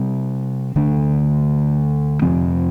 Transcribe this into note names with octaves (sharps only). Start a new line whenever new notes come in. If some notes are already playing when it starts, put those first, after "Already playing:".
Already playing: C3 G3 C4
D2 D3 A3 D4
F2 C3 F3 C4